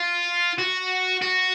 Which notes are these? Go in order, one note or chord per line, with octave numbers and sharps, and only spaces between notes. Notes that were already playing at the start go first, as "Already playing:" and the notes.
Already playing: F4
F#4
F#4